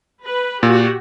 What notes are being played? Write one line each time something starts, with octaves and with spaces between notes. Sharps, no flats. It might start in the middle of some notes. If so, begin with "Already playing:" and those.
B4
A#2 F#4 G4